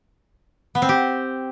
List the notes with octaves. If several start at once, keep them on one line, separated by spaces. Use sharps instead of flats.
B3
C4
G4